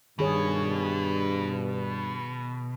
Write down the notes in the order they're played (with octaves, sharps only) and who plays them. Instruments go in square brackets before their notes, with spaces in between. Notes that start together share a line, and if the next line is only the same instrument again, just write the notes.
[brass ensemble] G2 [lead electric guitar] B2 [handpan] D#3 G#4 C#5